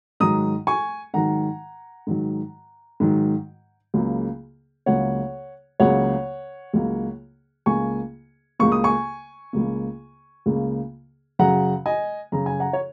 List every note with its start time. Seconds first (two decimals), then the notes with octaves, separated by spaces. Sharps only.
0.20 G#2 D#3 F#3 A#5 D#6
0.67 G#5 C#6
1.14 G#2 D#3 F#3 F#5 A#5
2.07 G#2 D#3 F#3
3.00 G#2 D#3 F#3
3.94 C#2 C#3 F#3 A#3
4.86 C#2 C#3 F#3 A#3 C#5 F#5
5.80 C#2 C#3 F#3 A#3 C#5 F#5
6.74 C#2 C#3 F#3 A#3
7.66 C#2 C#3 A#3 G#5 C#6
8.59 C#2 C#3 A#3 C#6
8.72 D#6
8.84 G#5 C#6
9.53 C#2 C#3 A#3
10.46 C#2 C#3 A#3
11.39 F#2 C#3 F#3 F#5 A#5
11.86 D#5 G#5
12.32 F#2 C#3 F#3 A#5
12.46 G#5
12.60 F#5 A#5
12.73 C#5